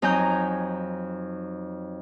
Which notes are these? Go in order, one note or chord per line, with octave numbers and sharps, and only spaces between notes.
F2 F#3 D#4 G#5 A#5 G6